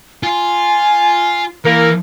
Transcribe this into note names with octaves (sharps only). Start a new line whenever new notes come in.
F4 G#5
E3 A#3 A#4